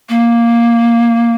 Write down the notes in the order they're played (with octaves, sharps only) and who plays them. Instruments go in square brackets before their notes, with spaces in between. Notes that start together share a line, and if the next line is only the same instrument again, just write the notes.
[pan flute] A#3